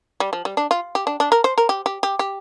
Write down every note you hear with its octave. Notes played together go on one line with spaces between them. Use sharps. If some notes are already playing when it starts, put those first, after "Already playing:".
G3
F3
G3
D4
F4
G4
D4
D4
A#4
C5
A#4
G4
G4
G4
G4